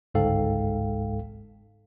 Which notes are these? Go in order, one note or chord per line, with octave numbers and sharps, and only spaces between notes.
G1 C#2 G#2 A4 F5 G5